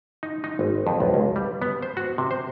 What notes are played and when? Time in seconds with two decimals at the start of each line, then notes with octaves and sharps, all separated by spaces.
0.23 D#4
0.44 D#4
0.59 G#1
0.87 F2
1.00 B1
1.14 C#2
1.36 G3
1.62 B3
1.83 C5
1.97 F#4
2.18 C3
2.31 C5